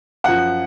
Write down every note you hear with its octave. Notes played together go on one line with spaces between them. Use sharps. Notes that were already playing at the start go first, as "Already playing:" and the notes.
F#2 F3 F#5